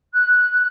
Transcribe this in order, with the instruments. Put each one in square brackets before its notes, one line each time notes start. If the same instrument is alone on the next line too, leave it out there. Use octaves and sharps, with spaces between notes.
[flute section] F#6